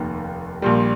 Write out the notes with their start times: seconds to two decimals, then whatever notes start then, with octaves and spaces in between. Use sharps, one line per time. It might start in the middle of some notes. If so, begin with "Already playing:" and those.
Already playing: F1 D#2 D#3
0.62 A#1 A#2 G3